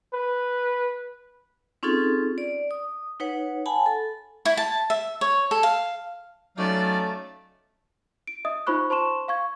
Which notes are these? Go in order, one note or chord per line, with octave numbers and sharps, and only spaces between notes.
B4
C4 C#4 D#4 F4 G#4 A4
D5
D#6
D#4 B4 C#5 F#5
F#5 G#5 A5 B5
A4
E4
A5
E5
C#5
A4
F5
F#3 A3 C#4 D#4 D5 F5
D7
D#5 E5 D#6
D#4 F4 C5 B5 C#6 F#6
C5 A5 C6 C#6 E7
F5 C#6 G#6